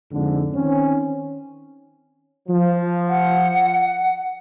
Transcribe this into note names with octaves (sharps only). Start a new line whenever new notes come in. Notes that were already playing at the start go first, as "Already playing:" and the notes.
F2 G#2 D3
D#3 C4 C#4
F3
F#5